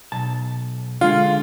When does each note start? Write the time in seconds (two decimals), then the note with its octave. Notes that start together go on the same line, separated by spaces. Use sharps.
0.12 B1 A5
1.01 D3 G#3 F4 F5